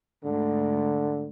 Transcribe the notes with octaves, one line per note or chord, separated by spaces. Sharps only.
D2 G#2 D3